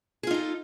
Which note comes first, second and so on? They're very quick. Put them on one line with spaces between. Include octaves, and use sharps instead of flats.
G#4 F4 D#4 A4